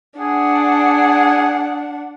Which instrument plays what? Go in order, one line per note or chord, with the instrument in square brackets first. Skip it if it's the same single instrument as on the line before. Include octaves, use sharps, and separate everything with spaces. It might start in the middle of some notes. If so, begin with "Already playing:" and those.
[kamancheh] D4 F#5 [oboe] G#4